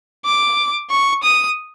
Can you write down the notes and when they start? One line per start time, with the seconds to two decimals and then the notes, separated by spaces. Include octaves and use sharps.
0.25 D6
0.90 C#6
1.23 D#6